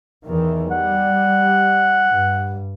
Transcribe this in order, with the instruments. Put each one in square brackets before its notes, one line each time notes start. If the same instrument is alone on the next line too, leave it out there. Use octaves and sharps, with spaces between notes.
[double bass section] E2 D#3 E3
[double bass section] G3 [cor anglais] F#5
[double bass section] G2